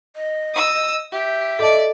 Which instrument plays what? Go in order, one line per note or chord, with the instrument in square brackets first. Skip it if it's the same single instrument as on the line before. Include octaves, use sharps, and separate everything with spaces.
[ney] D#5
[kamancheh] D#6 E6
[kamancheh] G4 [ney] E5
[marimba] A4 D#5 A5 [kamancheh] D5 D6